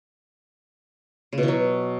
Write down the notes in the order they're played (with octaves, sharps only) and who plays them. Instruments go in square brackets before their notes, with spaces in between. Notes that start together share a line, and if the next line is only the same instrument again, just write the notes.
[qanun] C#3
B2
E3
F#3